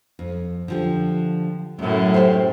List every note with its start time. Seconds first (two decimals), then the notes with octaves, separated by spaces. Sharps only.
0.19 F2
0.68 D3 F3 G4
1.79 F#2 A2 A3
2.14 G4 C5